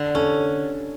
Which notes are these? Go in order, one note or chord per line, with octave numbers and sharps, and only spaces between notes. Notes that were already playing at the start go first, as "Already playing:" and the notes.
Already playing: D3
C#4 A4